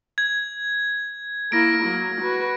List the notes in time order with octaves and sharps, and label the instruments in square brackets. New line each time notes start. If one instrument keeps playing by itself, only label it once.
[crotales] G#6
[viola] A#3 E4 [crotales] A#6 D7
[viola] F#3 A#3
F#4 B4